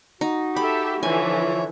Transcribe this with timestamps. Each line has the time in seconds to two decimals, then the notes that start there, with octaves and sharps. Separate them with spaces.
0.21 D#4 F#4
0.56 G4 A4 E5 B5
1.03 D3 E3 F3 C#5 E5 G#5